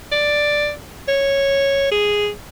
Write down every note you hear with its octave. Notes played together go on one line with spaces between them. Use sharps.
D5
C#5
G#4